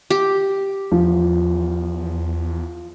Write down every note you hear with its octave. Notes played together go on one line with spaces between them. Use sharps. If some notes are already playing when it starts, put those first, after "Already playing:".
G4
E2 F3